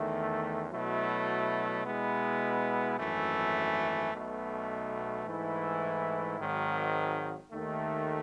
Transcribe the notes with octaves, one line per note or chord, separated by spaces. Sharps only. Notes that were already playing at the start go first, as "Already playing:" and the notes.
Already playing: E2 D#3 A3
B2 F#3 A3 E4
B2 G#3 B3 E4
G#1 F#2 E3 A3
B1 B2 A3
G#2 E3 A3 E4
G#1 G#2 D#3 F#3
D#2 D#3 A3